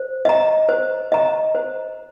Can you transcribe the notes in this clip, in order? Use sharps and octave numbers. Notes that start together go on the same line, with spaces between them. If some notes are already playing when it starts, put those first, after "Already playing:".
Already playing: C5
D#5 A#5
C5
D#5 A#5
C5